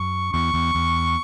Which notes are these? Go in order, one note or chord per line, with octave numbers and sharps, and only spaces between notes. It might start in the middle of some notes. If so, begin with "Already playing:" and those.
Already playing: F#2 C#6
E2 C#6
E2
E2